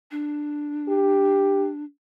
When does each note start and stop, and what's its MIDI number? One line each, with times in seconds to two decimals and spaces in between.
0.11 1.84 62
0.89 1.70 67